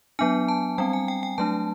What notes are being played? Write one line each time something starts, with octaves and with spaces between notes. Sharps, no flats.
F#3 B3 D4 G#5
A5
G3 C4 G5
G#5
G5
G5
F#3 A3 D4 A5